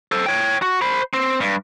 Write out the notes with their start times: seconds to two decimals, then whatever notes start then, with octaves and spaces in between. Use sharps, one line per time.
0.12 A4 C5
0.26 C#5 G5
0.62 F#4
0.81 C5 B5
1.14 C4
1.40 G2